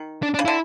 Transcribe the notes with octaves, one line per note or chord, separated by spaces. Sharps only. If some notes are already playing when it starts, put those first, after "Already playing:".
Already playing: D#3
D4
D4
C#3
D3 E4